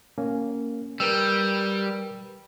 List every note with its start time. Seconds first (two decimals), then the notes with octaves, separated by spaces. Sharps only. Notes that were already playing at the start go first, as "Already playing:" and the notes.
0.18 A#3 C#4
1.00 G3 A#4 B4 E6